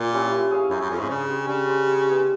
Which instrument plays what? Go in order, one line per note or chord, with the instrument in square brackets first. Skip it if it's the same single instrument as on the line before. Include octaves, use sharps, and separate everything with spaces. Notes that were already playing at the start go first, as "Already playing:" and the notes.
Already playing: [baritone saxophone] A#2
[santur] C#4 E4 G4
E4
G#4 C#5 F5
[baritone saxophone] F#2 [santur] E4
[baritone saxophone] F#2
[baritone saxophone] F2 [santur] G#4 C#5 F5
[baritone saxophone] G#2
[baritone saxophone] C#3 [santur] D4
[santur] G4 C5
[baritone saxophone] C#3 [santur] D4
[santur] G4 C5
G3
B3 E4